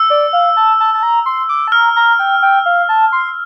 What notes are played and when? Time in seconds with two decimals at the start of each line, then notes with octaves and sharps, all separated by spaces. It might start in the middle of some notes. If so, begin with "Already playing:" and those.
Already playing: E6
0.10 D5
0.33 F5
0.57 A5
0.80 A5
0.94 A5
1.03 A#5
1.26 C6
1.49 D6
1.68 A5
1.72 A#5 F6
1.96 A#5
2.19 G5
2.42 G5
2.66 F5
2.89 A5
3.12 C6